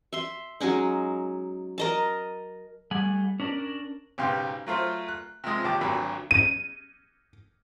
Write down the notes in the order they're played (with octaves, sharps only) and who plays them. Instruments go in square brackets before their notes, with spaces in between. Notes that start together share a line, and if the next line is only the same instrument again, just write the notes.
[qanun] E5 C6
F#3 G#3 C#4 D#4
A#4 D#5 A5
[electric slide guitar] G3 A3 F#5 G#5
C#4 D4 A#4 D5
[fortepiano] B1 G#2 C#3 G4 C6
F#3 A3 F4 C5
F#6
C3 F3 G#3 D#6
A#1 D#2 G4 A5 D6
G#1 D2 D3 F#3 B5
[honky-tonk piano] D#7